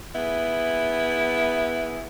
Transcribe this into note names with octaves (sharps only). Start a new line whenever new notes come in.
B3 E4 G#4